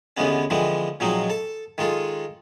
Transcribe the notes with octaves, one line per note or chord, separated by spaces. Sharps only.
D#2 D3 E3 G#3 B3 C#4
D3 E3 F3 G#3 C4
A#2 F3 F#3 G#3 C4 D#4
A4 A5
D#3 G#3 F4 A4